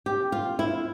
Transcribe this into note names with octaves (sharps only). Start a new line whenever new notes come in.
G4
F4
E4